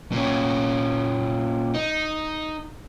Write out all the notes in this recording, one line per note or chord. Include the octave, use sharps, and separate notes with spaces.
A#2 C#4
D#4